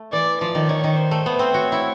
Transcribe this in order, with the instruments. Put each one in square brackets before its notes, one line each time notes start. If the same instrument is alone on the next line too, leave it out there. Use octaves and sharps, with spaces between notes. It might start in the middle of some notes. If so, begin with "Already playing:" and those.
Already playing: [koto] A3
[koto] E3 [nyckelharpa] D5
[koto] F3 [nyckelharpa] D5
[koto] D#3
[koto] D#3 [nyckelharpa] C#5
[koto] D#3
[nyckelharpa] C5
[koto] A3
B3
C4
[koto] F#4 [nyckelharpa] C#5
[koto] E4